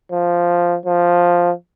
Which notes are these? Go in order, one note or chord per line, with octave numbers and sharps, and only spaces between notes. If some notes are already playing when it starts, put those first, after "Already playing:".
F3
F3